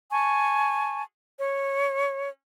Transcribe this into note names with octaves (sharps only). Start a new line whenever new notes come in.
G#5 A5 C#6
C#5